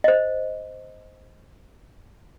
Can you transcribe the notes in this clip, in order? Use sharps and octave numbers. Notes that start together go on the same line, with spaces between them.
C5 D#5